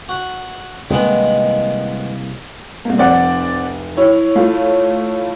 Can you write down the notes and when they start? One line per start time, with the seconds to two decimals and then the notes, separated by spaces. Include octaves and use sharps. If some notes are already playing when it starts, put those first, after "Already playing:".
0.09 F#4
0.90 C2 D#3 G#3 A#3 B3
2.85 C2 A#3
2.98 F1 C4 D5 F#5
3.97 E4 C#5
4.35 A3 F4